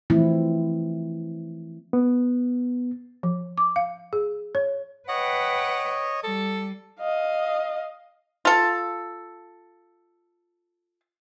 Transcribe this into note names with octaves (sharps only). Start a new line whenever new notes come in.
E3 F3 A3 C4 E4
B3
F3
D6
F5
G#4
C#5
B4 C#5 D#5 F#5 G5
G3 A4
D#5 F5
F4 A4